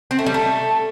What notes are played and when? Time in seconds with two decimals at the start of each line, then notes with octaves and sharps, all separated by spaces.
0.11 C4
0.19 A3
0.26 G3
0.34 A3